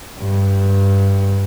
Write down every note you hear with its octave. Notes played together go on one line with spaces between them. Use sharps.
G2